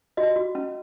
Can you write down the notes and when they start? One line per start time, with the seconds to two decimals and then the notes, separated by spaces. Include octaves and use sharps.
0.17 F#4 D#5
0.36 F#4
0.55 C#4